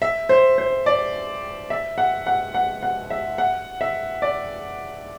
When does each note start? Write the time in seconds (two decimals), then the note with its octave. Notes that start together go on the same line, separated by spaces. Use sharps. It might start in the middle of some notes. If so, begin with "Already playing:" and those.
0.02 E5
0.29 C5
0.58 C5
0.86 D5
1.70 E5
1.98 F#5
2.27 F#5
2.54 F#5
2.83 F#5
3.10 E5
3.38 F#5
3.81 E5
4.22 D5